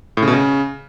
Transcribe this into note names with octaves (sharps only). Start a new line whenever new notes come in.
A2
C#3
B2
C#3